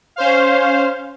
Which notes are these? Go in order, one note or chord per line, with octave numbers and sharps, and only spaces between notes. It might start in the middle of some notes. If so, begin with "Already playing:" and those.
C#4 C5 F5